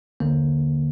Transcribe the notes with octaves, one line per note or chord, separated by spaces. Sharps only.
D#2 D3 A#3